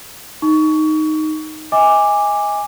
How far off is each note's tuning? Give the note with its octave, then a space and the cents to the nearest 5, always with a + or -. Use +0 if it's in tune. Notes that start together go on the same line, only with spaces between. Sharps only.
D#4 +0 C#6 +25
D#5 +35 G#5 -15 D6 +0